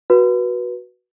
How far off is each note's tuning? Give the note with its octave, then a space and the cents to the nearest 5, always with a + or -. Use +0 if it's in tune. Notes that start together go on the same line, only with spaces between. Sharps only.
F#4 +0 B4 -20